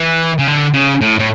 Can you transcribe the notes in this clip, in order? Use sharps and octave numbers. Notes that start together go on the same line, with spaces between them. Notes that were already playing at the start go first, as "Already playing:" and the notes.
Already playing: E3
C#3
D3
C#3
A2
A2